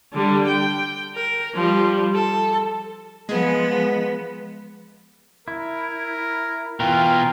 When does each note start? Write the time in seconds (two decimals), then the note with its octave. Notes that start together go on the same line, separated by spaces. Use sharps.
0.13 D3 G3
0.47 G5
1.15 A#4
1.54 F3 G3
2.14 A4
3.29 F3 G#3 B3
5.48 E4 A#4
6.80 B2 E3 F4 A#4 G5